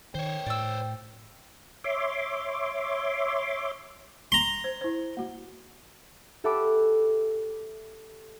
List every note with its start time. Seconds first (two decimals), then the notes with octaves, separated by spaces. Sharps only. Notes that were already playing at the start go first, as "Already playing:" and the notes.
0.15 D#3 C5 C#5 G5
0.46 A2 D5 E6
1.84 C#5 E5 C6 D6
4.32 A#5 C6
4.64 C5
4.81 E4 C5
5.17 A#3 F#4
6.44 G4 A4 E5 F#5 B5 D6